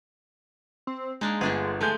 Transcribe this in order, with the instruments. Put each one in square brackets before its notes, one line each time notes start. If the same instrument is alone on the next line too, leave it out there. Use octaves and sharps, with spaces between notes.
[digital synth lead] C4
[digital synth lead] G#3 [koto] A#3 D4 D#4
[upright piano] G1 [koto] D3 D4 G#4
[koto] F3 G#3 [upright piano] A3 G6 [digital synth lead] G#5